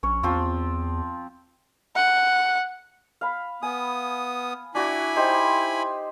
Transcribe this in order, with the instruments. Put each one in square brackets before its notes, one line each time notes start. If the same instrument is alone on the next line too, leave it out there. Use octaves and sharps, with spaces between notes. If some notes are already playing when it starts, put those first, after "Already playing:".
[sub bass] A#1 [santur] C#4 C#5
[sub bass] E2 [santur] F3 C4 F4
[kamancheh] F#5
[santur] F5 B5
[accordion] B3 D#6 [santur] G#5
[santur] D4 F#4 [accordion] E4 G#5 B5
[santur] D#4 G4 C5